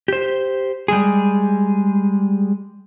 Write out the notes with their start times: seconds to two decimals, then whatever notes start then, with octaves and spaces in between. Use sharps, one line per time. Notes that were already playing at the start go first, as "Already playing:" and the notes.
0.08 G4 C5
0.88 G3 G#3 G#4